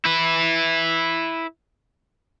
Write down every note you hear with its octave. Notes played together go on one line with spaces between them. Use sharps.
E4 B4